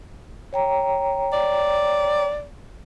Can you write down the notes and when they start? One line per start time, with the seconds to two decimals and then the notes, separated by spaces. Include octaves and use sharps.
0.53 C#5 G5 A#5
1.33 D5